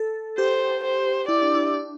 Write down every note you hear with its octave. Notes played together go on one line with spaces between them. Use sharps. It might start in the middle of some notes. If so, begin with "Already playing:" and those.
Already playing: A4
G4 C5
C5
E4 D5
D4
E4
D4